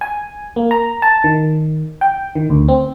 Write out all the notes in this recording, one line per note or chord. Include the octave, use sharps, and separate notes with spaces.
G#5
A#3
A#5
A5
D#3
G5
D#3
D2
C4